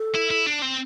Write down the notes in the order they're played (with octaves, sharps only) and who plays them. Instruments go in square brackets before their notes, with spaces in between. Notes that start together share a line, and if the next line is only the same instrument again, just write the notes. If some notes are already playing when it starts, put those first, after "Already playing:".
Already playing: [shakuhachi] A4
[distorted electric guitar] E4
E4
D4
C4